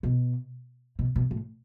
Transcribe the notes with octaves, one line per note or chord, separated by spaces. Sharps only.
B2
B2
B2
A2